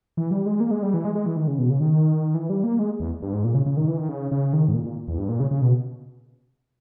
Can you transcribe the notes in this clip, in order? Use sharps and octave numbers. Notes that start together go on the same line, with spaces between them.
E3
G3
G#3
A#3
G#3
G3
E3
G#3
G#3
E3
D#3
C#3
B2
C#3
D#3
E3
G3
A#3
G#3
E2
G2
G#2
A#2
C#3
C#3
D#3
E3
D#3
C#3
C#3
D#3
G#2
A#2
A#2
E2
G2
A#2
C#3
C#3
B2